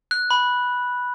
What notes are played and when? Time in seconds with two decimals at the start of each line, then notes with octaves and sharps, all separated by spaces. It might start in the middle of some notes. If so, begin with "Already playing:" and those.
0.11 F#6
0.31 B5